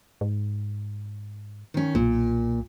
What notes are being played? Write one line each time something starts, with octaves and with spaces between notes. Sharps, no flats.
G#2
D#3 C#4
B1 A#2